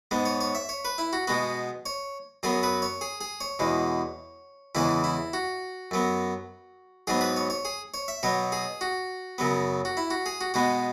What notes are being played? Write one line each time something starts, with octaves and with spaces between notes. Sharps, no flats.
G#2 G#3 B3
C#5
C#5
E5
C#5
B4
E4
F#4
B2 G#3 B3 F#4
C#5
F#2 F#3 B3 G#4
B4
C#5
G#4
G#4
C#5
E2 B2 G#3
E2 C#3 E3 G#3 E4
E4
F#4
F#2 F#3 B3
G#2 F#3 B3 G#4
B4
C#5
C#5
G#4
C#5
E5
B2 F#3 B3 C#5
G#4
F#4
F#2 C#3 F#3 B3
F#4
E4
F#4
G#4
F#4
B2 G#3 B3 F#4